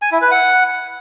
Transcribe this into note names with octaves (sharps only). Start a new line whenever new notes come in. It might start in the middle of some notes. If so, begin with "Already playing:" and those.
G#5
E4
B4
F#5